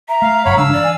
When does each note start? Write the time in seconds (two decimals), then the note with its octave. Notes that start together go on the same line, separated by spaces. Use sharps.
0.09 E5 A#5
0.22 A3 F5
0.45 F#1 G2 F#3 C#5 F5 F#5 B5
0.57 G2 C#3 G#3 D4 F5 E6
0.72 E3 D5
0.84 G#5